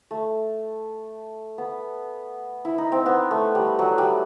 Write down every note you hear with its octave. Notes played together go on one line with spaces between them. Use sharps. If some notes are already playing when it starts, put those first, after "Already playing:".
A3
B3
E4
D#4
C4
B3
A3
G3
F#3
G3